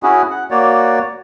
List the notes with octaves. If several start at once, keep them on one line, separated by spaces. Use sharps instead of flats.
C#4 E4 F#4 G#4
F#5
A#3 F#4 C#5 D5